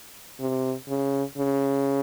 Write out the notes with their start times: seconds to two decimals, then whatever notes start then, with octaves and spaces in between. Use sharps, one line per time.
0.40 C3
0.89 C#3
1.38 C#3